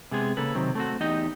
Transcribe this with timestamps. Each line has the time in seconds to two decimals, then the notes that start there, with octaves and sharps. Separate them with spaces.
0.11 C3 G#3 B3 G#4
0.37 C#3 A#3 A4 B4
0.55 C3 D#3 F#3 C4
0.75 A3 C4 F#4
1.01 E2 D#4 G4 D#5